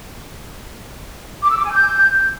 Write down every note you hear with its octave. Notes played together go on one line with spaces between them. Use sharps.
D6
E6
D6
G#5
G6